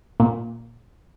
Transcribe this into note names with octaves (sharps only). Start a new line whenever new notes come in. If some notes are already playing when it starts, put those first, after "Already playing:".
A#2